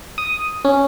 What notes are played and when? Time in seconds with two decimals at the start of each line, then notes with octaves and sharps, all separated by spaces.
0.18 D#6
0.65 C#4